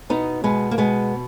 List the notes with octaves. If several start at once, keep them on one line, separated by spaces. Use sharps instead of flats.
B2 B3 D#4
B2 G#3 B3
A#3
B2 G#3 B3